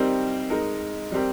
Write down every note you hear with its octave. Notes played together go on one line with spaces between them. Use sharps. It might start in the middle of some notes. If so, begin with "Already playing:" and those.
Already playing: G3 C4 D#4 G4 A#4
G#3 D#4 A#4
G3 C4 G4 A#4